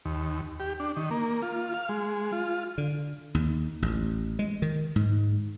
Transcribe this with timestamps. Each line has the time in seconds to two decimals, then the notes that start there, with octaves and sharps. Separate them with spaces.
0.05 D#2
0.60 G4
0.80 D4
0.97 D#3
1.11 A#3
1.42 F4
1.74 F5
1.89 G#3
2.33 F4
2.78 D3
3.35 D#2
3.82 A1
4.39 G#3
4.62 D#3
4.96 G#2